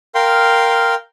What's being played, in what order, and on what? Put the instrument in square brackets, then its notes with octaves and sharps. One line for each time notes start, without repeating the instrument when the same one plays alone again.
[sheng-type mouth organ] A#4 F5 G5 C6